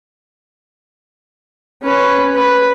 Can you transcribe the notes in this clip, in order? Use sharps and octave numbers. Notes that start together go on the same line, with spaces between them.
C#4 B4
B4